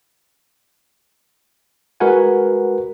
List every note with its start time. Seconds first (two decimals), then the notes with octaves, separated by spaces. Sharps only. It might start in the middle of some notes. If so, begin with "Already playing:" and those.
2.00 G#3 F#4 A#4 B4 F#5 G#5